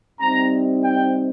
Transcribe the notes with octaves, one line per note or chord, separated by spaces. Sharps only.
C3 G3 C4 D#4 A#5
G5